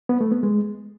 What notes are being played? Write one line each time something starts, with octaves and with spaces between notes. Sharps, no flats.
B3
A3
B3
G#3